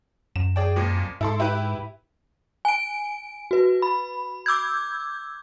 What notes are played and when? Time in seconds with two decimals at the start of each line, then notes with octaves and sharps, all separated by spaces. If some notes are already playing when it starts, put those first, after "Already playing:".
0.36 F#2 E7
0.56 G#4 D5 G5
0.76 F2 A#2
1.21 G#2 E4 A4 C6
1.40 E4 G4 B4
2.65 G#5 D7
3.51 F#4 B4
3.82 B5
4.46 D6 E6 G6 G#6